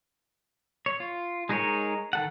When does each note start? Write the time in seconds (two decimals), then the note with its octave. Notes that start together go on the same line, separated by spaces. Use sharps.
0.86 C#5
1.00 F4
1.49 G#3 D#4 G#4 A#4 C#5
2.13 D#3 A4 F#5